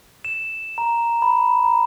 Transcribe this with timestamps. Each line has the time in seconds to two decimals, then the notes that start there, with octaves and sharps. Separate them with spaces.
0.25 E7
0.78 A#5
1.22 B5
1.64 A#5